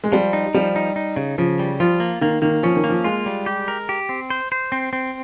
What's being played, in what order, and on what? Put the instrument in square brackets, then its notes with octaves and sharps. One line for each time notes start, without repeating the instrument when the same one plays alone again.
[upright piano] G#3
[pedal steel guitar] F3 [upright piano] G3
[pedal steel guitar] D#4
[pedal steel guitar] F3 [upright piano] G3
[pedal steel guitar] D#4
D#4
C#3
[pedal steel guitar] C#3 [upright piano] F3
[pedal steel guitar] G3
[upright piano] F3 [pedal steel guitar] F4
[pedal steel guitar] A#3
[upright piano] D#3 [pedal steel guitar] A#3
[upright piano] D#3 [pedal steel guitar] A#3
[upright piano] F3 [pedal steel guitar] C#4
[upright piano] D#3
[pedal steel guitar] A#3
[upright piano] F3
[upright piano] G#3 [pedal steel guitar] F4
[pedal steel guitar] G3
G4
A#4
G4
C4
C5
C5
C4
C4